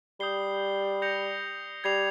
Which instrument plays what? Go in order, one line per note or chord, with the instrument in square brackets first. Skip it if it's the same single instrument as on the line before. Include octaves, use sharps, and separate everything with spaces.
[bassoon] G3 [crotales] D#6 G6 C7 G7
[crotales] G6 A#6 C#7 F7
[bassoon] G3 [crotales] G#6 C7 F7